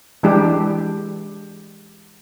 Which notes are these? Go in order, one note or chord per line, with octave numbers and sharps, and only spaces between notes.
E3 G#3 D4 E4 G4